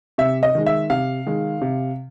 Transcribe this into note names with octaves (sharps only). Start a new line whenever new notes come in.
C3 E5
D#5
D#3 G#3
E5
C3 F5
D#3 G#3
C3